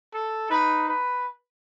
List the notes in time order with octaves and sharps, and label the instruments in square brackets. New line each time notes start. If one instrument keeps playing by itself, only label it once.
[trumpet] A4
[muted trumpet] D#4 [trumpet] B4
[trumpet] B4